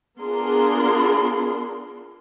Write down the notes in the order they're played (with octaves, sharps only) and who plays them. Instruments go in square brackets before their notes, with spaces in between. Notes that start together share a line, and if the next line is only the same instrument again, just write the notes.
[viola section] B3 D4 F4 G#4 A#4 C6